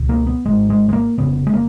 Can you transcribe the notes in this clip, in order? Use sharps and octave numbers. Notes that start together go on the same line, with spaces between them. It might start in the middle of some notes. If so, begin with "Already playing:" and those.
Already playing: C#2 B2
A#3
B3
G#1 G#2 G#3
G#3
G#3
A#3
F1 F2 C#3 B3
G#3
A#3